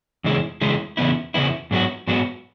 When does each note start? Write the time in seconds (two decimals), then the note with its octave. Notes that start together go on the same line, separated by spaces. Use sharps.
0.24 E2 C#3 G#3 E4 G#4
0.61 E2 C#3 G#3 E4 G#4
0.97 E2 C#3 B3 E4
1.34 E2 C#3 E3 B3 E4
1.71 G#2 F#3 B3 F#4
2.07 G#2 F#3 B3 F#4